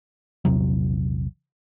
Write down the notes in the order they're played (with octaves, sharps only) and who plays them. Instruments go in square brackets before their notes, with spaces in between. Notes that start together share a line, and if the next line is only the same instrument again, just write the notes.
[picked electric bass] A#1 E2 C3 F#3